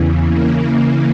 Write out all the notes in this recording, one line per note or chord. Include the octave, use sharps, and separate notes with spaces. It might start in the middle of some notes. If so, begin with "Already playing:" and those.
Already playing: E2 C#3 E3
C#3 E3 A#3